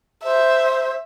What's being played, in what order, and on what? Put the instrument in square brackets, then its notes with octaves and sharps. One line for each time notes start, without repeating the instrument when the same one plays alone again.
[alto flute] C5 [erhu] E5